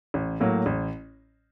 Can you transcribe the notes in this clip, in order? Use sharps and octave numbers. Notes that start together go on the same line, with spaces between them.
A1
A2 F#3 A#3
A1